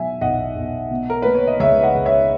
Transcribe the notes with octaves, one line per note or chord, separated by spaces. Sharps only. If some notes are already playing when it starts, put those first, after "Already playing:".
Already playing: B2 F#3 E5 G#5
B1 D#5 F#5
B1
B2
A#4
A#3 B4
C#5
D#5
C#2 C#5 E5
D#5 F#5
C#2
C#5 E5